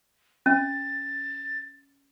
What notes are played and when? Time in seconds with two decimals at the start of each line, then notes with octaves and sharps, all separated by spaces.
0.46 C#4 A6